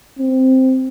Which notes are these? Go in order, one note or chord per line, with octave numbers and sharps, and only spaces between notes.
C4